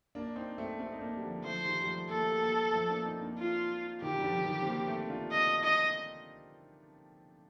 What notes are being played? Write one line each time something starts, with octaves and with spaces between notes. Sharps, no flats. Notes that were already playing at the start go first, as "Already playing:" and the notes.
A#3 D4
C4 D#4
A3 C4
A3 C4
D#4
A#3 D4
G3
D3 F3
F3 A3 C5
D#3 G3
G3
F3 A3
A#3 A4
A3
G3 A#3
G3 A#3
F3 A3
A#3 D4
C4 D#4
A#3 D4
F4
C3 D#3 G4
G3
D3 F3
D#3 G3
C4
G3 A#3
A3 C4
D4 F4
D#5
D#5